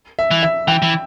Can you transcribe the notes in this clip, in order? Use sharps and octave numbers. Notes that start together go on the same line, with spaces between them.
E5
E3
E5
E3 G5
E3